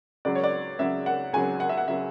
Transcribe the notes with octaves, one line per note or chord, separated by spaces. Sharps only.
C#2 C#3 F#3 D5
C#5
D5
C#2 C#3 F#3 E5
F#5
C#2 C#3 F#3 G#5
F#5
E5
F#5
C#3 F#3 E5